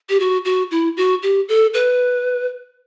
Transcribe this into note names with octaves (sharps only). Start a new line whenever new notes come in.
G4
F#4
F#4
E4
F#4
G4
A4
B4